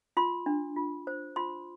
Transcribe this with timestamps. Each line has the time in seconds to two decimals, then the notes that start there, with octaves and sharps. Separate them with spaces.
0.17 F4 C6
0.46 D4
0.76 F4
1.07 C5
1.36 F4 C6